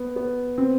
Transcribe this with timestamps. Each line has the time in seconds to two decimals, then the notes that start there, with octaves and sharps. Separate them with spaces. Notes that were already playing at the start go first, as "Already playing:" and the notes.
Already playing: B3
0.16 B3
0.58 C4